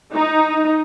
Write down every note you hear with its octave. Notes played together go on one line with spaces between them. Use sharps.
D#4